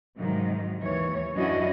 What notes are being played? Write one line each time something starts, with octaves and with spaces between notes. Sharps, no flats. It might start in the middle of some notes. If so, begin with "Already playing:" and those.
G#2 C3 D#3 F3 F#3
D#2 E3 C#5
F#2 C#4 D4 E4 F#4 D#5